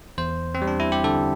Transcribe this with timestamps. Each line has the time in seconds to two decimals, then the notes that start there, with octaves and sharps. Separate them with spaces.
0.18 E2 C5
0.55 C4
0.62 G3
0.67 D4
0.80 E4
0.92 G4
1.04 D3 A4